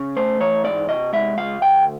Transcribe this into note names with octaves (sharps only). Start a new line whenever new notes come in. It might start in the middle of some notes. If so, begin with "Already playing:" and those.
Already playing: C#3
A3 C5
E3 C#5
G#2 D5
C3 D#5
G#3 E5
C#3 F5
D2 G5